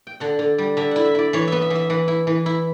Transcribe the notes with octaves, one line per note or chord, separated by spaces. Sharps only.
G5
D3 F#5
D3
G3
D3 E5
E4 F#5
E5
E4 D5
E3 C#5
B3 E5
E5
E3
E5
E3 F#5
E4
E3
E4